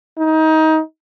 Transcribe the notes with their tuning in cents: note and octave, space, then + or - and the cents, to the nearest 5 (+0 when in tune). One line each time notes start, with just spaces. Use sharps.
D#4 +25